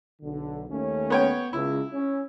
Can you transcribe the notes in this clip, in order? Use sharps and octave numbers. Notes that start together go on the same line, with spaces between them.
B1 D3
D#2 A3 C#4
B3 C#5 G5
C#2 E4
C#4